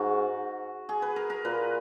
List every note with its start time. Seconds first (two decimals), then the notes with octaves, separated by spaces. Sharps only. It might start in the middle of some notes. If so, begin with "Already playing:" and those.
Already playing: G#2 F#4
0.89 G#4
1.02 B4
1.16 A#4
1.30 A#4
1.45 A#2 B4